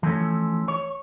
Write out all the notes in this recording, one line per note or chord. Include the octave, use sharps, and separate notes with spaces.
E3 F3 A3 C#4
C#5